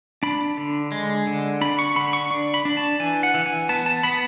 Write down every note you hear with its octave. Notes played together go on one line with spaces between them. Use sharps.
D4 B5
D3
G#3
D3
D4 B5
C#6
D3 B5
C#6
D4 C#6
B5
D4
A5
E3 G#5
F#5
E3
G#5
B3 A5
A5
B3 B5